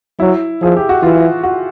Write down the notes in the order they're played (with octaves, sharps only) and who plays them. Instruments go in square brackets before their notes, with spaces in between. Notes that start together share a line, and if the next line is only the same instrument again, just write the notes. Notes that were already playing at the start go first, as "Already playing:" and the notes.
[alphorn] F#3 [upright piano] E4
[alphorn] F3 [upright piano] G#4
[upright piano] G4
F#4
[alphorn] E3 [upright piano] F4
[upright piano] F#4